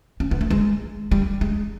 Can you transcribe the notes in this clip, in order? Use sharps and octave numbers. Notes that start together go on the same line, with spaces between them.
C#4
B3
A3
G#3
G3
G#3